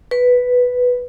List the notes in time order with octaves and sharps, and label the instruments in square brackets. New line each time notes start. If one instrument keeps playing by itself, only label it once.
[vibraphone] B4